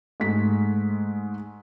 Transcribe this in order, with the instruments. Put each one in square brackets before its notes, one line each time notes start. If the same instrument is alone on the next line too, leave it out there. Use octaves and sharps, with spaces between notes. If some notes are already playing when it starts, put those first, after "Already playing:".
[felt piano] G#2 G#3 A3 B6